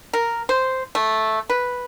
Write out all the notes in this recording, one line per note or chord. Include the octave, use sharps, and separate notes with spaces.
A#4
C5
A3
B4